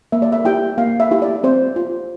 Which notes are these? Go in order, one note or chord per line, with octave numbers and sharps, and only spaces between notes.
A#3 E5
D5
E5
E4 G4 G5
A#3 F5
E5
E4 G4
D5
C4 C5
F4